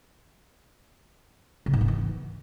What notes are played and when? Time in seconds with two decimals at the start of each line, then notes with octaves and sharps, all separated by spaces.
1.66 C#3
1.73 G#2
1.81 B3
1.88 E3